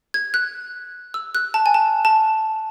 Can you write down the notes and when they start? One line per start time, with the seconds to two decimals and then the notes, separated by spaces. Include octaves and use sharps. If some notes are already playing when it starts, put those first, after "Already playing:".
0.14 G#6
0.34 F#6
1.14 E6
1.35 F#6
1.54 A5
1.66 G#5
1.74 A5
2.05 A5